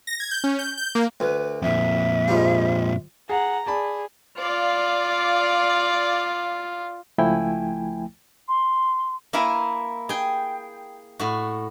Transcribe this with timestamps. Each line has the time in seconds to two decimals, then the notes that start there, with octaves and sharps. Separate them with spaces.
0.07 A#6
0.20 G#6
0.31 G6
0.44 C#4
0.59 G6
0.77 G6
0.95 A#3
1.20 D2 B4
1.62 F2 A#2 E5
2.28 G#2 F3 G3
3.29 G#4 F#5 A#5
3.66 G#4 D5 A5 B5
4.39 F4 D5 F5
7.18 C#2 F3 A3 E4 G5 G#5
8.48 C6
9.33 A#3 E4 A#4 E5 G#5
10.09 G#4 G5
11.20 A2 F#4